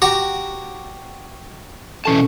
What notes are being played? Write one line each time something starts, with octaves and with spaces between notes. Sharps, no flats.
F#4 G4 A#5
B2 E3 C#4 A4 A5